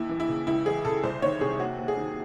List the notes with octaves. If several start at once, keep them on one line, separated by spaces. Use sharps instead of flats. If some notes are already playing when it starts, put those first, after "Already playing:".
Already playing: D#2 E4
E3
E4
C#3
C#2 E4
E3 G#4
C#3 A4
C2 C5
D#3 C#5
C3 G#4
D#2 F#4
D#2
G#4
D#3